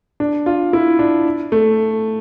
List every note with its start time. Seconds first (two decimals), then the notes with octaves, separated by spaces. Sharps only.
0.20 D4
0.46 F4
0.73 E4
0.99 D4
1.52 A3